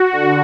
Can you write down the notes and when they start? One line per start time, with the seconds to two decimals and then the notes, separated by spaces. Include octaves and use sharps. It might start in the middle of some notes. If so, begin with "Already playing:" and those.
Already playing: F#4
0.12 D3